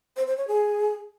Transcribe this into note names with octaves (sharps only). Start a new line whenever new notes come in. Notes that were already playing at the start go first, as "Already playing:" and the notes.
C5
C5
C#5
G#4